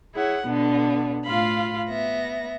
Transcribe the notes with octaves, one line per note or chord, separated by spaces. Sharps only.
E4 G#4 C#5 F#5
B2 D3 B3
A2 F4 F5 B5
B3 E5 A#6